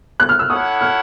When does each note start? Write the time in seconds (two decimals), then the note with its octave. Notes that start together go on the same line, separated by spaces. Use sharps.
0.20 F#6
0.29 F6
0.39 E6
0.50 E4 A4 C#5 F#5 D#6
0.81 F6